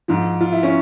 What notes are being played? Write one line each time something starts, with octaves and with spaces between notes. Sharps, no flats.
G#2 F3
F4
E4
C#4